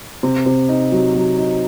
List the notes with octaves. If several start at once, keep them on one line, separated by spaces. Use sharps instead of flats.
C3
C3
D#4
F#3
F#3
D#4